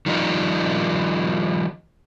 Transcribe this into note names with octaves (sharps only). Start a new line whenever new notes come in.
D#3 F3 G3 D#4